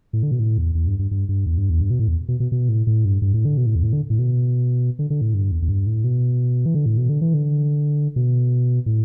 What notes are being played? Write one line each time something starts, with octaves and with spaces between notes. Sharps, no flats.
A2
D3
B2
A2
E2
E2
G2
G2
G2
G2
E2
G2
E2
G2
B2
A2
E2
B2
B2
B2
A2
A2
G2
G2
A2
D3
B2
A2
E2
A2
D3
A2
B2
D3
D3
A2
G2
E2
E2
G2
A2
B2
E3
D3
A2
B2
D3
E3
D3
B2
A2